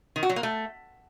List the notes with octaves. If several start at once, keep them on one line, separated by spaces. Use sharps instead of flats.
D#3
F#4
F#3
A#3
A3